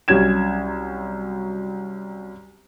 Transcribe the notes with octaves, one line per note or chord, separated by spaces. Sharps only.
C2 F#3 C#4 G#6 E7